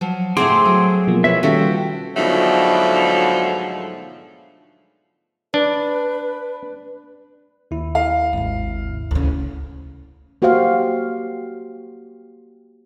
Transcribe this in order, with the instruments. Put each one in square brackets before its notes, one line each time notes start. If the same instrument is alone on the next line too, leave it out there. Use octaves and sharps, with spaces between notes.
[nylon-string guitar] F3 F#3
[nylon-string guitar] A2 F#5 [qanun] A3 C4 G#4 [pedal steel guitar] C6 D6
[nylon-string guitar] F#3
[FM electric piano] B2 F3 A#3
[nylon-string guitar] E4 B4 C#5 [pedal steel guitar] E5
[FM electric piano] D#3 G3 C#4 [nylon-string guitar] F4 A4 E5 [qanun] F#4 [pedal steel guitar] G5
[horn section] G#2 B2 D3 F3 F#3 A3
[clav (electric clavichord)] D4 [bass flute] B4
[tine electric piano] D#2 E4
[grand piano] F5
[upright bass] G#1 C#3
D2 C#3
[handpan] A#3 F#4 G4 C5 F5